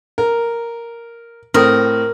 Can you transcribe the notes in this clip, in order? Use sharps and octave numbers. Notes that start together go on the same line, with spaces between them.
A#4
A2 C4 A#4 D#6